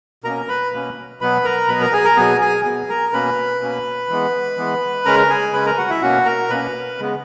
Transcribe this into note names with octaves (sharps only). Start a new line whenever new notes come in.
B2 A#3 C#4 A#4 A#5
B4 B5
B2 A#3 C#4
B2 F#3 B3 B4 B5
A#4 A#5
B2 F#3 B3 B4 B5
A#4 A#5
G#4 G#5
A#4 A#5
B2 F#3 B3 G#4 G#5
G#4 G#5
B2 F#3 B3 G#4 G#5
A#4 A#5
B2 A#3 C#4 B4 B5
B2 A#3 C#4
E3 G#3 B3
E3 G#3 B3
C#3 G#3 C#4 A#4 A#5
G#4 G#5
C#3 G#3 C#4 B4 B5
A#4 A#5
F#4 F#5
E4 E5
B2 A#3 C#4 F#4 F#5
A#4 A#5
B2 A#3 C#4 B4 B5
C#3 G#3 B3